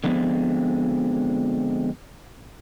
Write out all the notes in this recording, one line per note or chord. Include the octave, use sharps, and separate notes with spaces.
D3 F3 G#3 B3 C4